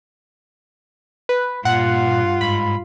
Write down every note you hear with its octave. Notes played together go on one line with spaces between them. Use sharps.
B4
G2 A#2 F4 F#5
G#2 B5